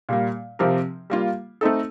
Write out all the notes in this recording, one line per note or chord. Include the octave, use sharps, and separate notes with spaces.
A#2 G3 A#3
C3 F3 C4 G4 A#4
G3 A#3 F4
A3 C4 D#4 A4